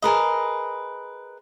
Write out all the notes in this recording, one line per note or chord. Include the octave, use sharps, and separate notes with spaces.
G#4 A#4 B4 D#5